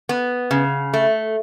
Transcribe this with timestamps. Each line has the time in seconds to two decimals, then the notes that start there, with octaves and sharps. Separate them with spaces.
0.09 B3
0.51 C#3
0.94 A3